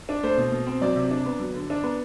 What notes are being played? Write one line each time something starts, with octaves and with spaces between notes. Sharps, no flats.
D4
A3 C5
B2
B2
C4
F#3 D5
C3
D4
B3
F#3
D3
D4
B3